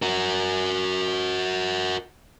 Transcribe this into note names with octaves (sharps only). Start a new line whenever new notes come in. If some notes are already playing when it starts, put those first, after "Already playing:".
F#4 A#4